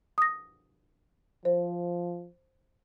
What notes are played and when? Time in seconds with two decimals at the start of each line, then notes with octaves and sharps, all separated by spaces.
0.18 D#6 A#6
1.45 F3 C5